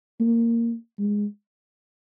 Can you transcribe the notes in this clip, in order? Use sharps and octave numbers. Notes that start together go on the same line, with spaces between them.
A#3
G#3